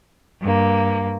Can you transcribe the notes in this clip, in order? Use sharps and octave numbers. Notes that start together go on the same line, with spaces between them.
G2 A#3